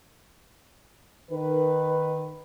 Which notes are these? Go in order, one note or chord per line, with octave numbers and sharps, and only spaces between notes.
D#3 B4